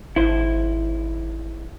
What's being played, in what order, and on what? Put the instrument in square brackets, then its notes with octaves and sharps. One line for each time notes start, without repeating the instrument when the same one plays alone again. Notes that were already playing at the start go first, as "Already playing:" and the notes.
[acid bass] G#1 [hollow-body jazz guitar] E4 C5